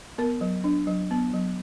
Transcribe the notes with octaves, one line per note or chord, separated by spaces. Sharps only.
B3 A#4
F#3
D4
F#3
B3
F#3